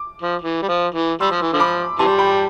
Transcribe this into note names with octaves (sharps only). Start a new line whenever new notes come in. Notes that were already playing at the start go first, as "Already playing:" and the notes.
Already playing: D6
F3
E3
G3
F3
E3
G3 C6 E6
F3
E3
D3 F3
B5 D6
C3 E3 G3 A5 C6
G5 B5